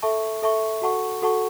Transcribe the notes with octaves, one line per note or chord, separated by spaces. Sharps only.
A4 E5 A5 C#6
A4 E5 A5 C#6
F#4 A4 F#5 A5 C#6
F#4 A4 F#5 A5 C#6